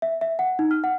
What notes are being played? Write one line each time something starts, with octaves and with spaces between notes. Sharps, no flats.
E5
E5
F#5
D#4
F6
F#5